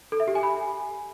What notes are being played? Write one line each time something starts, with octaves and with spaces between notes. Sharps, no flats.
A4
E5
G4
G#5
B5